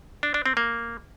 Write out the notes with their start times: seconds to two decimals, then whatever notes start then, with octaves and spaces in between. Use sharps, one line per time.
0.23 D4
0.34 D4
0.46 C4
0.57 A#3